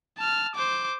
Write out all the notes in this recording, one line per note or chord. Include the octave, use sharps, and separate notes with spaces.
A5 F6
C5 D6